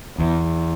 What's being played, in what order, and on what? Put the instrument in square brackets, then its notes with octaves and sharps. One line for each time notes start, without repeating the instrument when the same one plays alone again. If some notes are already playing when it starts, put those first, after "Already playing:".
[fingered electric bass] E2